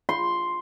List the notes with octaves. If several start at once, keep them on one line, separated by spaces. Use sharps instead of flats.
C6